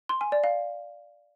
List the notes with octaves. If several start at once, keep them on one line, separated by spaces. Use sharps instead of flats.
C6
G#5
D5
F5